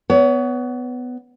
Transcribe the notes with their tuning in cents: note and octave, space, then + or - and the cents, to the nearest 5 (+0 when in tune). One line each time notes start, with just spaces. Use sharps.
B3 +15 C#5 +30